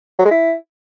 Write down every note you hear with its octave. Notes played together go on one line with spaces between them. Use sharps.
F#3
G#3
E4